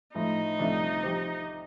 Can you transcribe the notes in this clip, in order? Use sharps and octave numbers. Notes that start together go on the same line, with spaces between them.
A2 F3 A3 D#4
C2 C3 F3 A3 D4
F3 C4 G4 C5